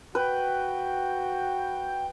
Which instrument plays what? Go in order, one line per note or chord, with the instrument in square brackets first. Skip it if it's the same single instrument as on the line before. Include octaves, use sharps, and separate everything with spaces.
[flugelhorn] F#4 [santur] B4 [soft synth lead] G5